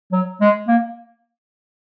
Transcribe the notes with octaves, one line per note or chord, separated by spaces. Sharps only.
F#3
G#3
A#3